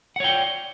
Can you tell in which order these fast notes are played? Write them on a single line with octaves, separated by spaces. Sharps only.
F#5 C#5 G5 D5